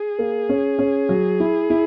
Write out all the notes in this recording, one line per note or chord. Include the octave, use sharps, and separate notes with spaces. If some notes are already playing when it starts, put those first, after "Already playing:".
Already playing: G#4
A#3
C#4
C#4
F#3
E4
E4